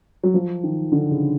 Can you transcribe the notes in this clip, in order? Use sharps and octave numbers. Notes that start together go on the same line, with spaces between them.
F#3
F3
D#3
D3
C#3